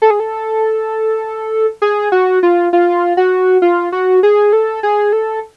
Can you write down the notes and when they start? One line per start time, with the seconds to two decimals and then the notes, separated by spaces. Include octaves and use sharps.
0.02 A4
0.10 G#4
0.20 A4
1.82 G#4
2.12 F#4
2.43 F4
2.73 F4
3.17 F#4
3.62 F4
3.92 F#4
4.23 G#4
4.53 A4
4.83 G#4
5.13 A4